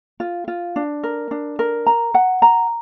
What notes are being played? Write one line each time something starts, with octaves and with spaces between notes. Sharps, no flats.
F4
F4
D4
A#4
D4
A#4
A#5
F#5
A#5